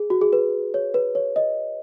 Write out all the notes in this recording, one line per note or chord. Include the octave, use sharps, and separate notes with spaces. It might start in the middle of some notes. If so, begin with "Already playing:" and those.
Already playing: G#4
F#4
G#4
B4
C#5
B4
C#5
D#5